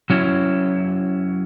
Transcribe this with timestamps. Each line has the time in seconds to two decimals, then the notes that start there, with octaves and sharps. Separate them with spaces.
0.10 F#3 C#4 E4